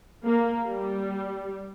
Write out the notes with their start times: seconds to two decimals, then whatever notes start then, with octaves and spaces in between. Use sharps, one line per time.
0.24 A#3
0.65 G3